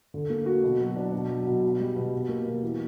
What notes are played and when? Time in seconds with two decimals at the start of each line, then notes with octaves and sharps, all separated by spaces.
0.14 D3
0.30 A#3
0.46 F#4
0.64 B2
0.80 F#3
0.96 D4
1.12 B2
1.30 F#3
1.47 B2
1.63 B2
1.80 G3
1.96 B2
2.13 B2
2.29 A#3
2.46 B2
2.63 E3